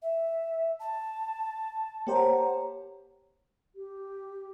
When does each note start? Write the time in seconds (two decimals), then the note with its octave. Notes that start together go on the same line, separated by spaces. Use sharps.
0.02 E5
0.80 A5
2.07 A#3 G4 C5 C#5 F#5 A#5
3.75 G4